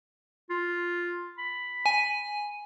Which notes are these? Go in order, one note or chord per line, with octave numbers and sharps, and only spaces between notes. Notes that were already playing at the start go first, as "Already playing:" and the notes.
F4
B5
G#5